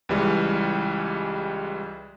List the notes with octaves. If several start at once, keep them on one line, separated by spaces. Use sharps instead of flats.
C#2 E3 G3 G#3